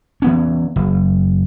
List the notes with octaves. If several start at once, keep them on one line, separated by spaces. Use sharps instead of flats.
E3 B3 C#4
F#1